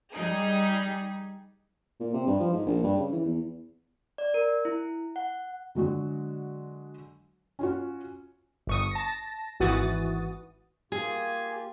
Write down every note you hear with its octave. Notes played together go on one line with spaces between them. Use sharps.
G3 D#4 G#4
A#2
C3
G2
F3
G#2
A#1
G2
C#3
E3
E2
D5
A#4
E4
F#5
D3 F#3 G#3 F#4
C#4 F4 F#4
G1 C#6 D#6
A5 A#6
G#1 E3 F#4 D#6 A6
A#3 F4 G4 G#4